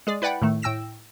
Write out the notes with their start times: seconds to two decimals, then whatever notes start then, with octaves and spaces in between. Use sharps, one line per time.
0.07 G#3 G#4 D5
0.22 E4 B4 D5 F#5 G5 B5
0.42 A2 D#3 A3
0.62 A2 G5 E6 A#6 E7